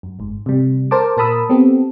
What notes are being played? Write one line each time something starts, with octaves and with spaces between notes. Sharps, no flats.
F#2
G1 G#2
C3 G3
A4 A#4 C5 A5 D6
A#2 A#4 A5 B5 D#6 E6
B3 C4 G4 A4